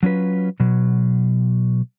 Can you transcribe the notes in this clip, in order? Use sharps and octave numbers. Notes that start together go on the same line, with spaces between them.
F#3 C#4 F4 B4
B2 F#3